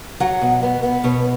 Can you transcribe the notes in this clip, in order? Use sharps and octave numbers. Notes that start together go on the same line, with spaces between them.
F#3 F#5
B2
B3
B3
B2 C#5